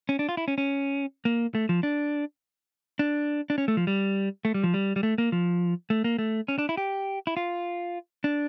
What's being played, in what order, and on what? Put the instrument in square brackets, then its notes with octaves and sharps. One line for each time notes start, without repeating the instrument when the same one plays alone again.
[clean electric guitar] C#4
D4
F4
E4
C#4
C#4
A#3
A3
F3
D4
D4
D4
C#4
A3
F3
G3
A3
G3
F3
G3
G3
A3
A#3
F3
A3
A#3
A3
C#4
D4
E4
G4
E4
F4
D4